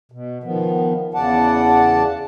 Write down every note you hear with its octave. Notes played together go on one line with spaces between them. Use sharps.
B2
D#3 F3 B3
E2 C#3 D5 F#5 A5